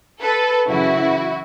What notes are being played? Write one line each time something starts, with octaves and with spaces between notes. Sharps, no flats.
A4 B4
F#2 C#3 E3 E4 F#4